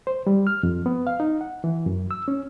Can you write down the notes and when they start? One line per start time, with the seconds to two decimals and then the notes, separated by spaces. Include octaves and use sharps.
0.07 C5
0.27 G3
0.47 F6
0.63 F2
0.86 B3
1.07 F5
1.20 D#4
1.41 F#5
1.64 E3
1.86 F#2
2.11 E6
2.28 C#4